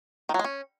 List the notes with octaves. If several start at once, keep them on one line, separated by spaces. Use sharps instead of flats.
D#3
F#3
G#3
C#4